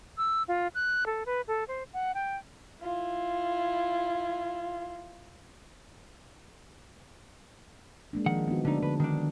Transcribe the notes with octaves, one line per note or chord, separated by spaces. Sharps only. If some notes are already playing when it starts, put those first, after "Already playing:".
E6
F4
F#6
A4
B4
A4
C5
F#5
G5
E4 F4
G#3 A#3 D4
D#3 F3 F#5
B3 D#4 F#4
D3 A3 D4 D#4
D3 B4
D#3 D4